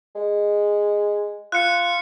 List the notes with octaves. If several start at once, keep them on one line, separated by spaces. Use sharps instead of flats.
G#3
F4 F#6 C#7